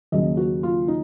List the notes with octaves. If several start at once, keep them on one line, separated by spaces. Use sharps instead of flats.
D#2 C#3 F#3 D#5
F#4
F4
D#4